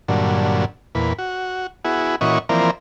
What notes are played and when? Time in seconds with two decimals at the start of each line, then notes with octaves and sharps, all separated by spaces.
0.08 G2 A#2 D3 F#3
0.95 E2 A#2 B4
1.18 F#4
1.84 B3 E4 F#4 G#4
2.21 A#2 E3 C#4 F#4 D#5 C#6
2.49 E3 F3 A#3 C4 A#4 D5